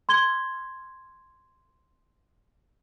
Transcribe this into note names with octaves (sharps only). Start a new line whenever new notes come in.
C6 G#6 G7